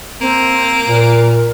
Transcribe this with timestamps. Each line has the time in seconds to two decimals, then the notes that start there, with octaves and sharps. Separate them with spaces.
0.21 A#3 C4
0.87 A#2 A#4